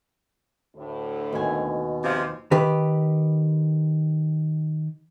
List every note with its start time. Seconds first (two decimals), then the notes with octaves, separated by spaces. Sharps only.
0.76 D2 A2
1.33 D#2 B2 G#5
2.03 C3 F3
2.51 D#3 G4 B4